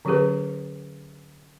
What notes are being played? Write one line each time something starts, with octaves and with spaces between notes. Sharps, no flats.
D3 F#3 C#4 G4 G#4 B4